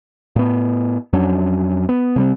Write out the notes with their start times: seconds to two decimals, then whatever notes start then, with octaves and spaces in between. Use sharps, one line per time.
0.36 A2 B3
1.13 F2 F#3 C#4 D4
1.89 B3
2.16 C3 G3 C4